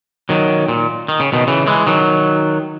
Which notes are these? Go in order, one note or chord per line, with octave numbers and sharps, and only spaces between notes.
D#3 F#3
A#2
D#3
C#3
B2 D#3
C#3 E3
E3 G#3
D#3 F#3